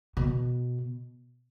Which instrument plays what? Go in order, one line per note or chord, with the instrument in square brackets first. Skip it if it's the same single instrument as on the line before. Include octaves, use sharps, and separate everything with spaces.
[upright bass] B2